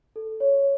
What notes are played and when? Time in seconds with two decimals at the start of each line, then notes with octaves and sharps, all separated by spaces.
0.16 A4
0.40 C#5